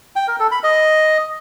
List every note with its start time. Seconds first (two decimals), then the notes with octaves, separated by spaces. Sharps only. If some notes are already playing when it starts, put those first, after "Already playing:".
0.16 G5
0.28 A#4
0.40 A4
0.51 B5
0.63 D#5